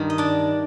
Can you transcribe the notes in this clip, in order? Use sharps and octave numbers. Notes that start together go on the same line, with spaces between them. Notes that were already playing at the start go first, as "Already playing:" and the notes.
Already playing: G2 D#3
D#5
D4 D5